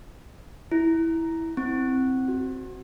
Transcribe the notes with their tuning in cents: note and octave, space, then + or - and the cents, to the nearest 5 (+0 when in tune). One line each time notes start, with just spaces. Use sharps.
E4 -10
C4 +0
F#4 +15